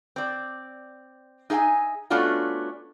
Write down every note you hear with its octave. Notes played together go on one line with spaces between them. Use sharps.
C4 D5
D#4 G#4 E5 F#5 G#5
A3 B3 C#4 D4 F4 F#4